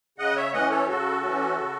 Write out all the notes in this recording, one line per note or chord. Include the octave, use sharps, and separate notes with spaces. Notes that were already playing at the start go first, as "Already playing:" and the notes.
C#3 D#5 F#5
C#5 E5
E3 A3 C#4 D#5 F#5
A4 C#5
C#3 F#4 A4
E3 A3 C#4
C#3